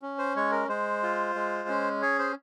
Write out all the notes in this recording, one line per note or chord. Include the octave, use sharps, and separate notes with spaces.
C#4
C5
G#3 C#5
A#4
G#3 C5
F4
G#3
C#4
G#4 C#5
C5